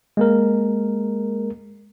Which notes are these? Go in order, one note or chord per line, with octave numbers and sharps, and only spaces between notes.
G#3 A#3 A#4